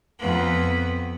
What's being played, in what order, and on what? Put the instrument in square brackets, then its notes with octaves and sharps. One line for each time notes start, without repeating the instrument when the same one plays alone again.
[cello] F2 B3